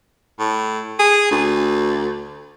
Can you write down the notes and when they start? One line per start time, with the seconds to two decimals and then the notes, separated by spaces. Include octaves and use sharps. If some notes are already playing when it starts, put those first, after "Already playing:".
0.39 A2
1.00 G#4
1.31 D2